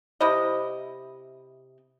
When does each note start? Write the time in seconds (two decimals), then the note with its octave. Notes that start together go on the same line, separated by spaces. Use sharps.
0.20 C3 E4 D#5